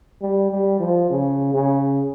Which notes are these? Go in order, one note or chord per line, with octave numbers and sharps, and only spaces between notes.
G3
G3
F3
C#3
C#3